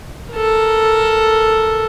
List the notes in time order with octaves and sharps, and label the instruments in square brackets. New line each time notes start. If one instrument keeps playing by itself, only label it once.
[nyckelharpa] A4 A#4